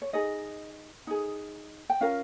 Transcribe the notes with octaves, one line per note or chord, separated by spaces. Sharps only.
C#5
D#4 G#4 D#5
D#4 G#4
G5
C#4 F4 A#4 F5